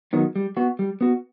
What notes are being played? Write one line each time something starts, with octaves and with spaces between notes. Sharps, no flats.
D#3 F#3 B3
G3
B3 F#4
G3
B3 F#4